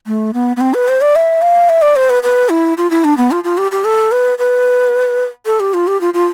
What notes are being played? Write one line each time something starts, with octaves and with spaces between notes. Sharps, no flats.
A3
B3
B3
C4
B4
C5
D5
E5
F5
E5
D5
C5
B4
B4
E4
F4
E4
D4
B3
F4
F4
G4
G4
A4
B4
B4
A4
G4
F4
G4
F4
F4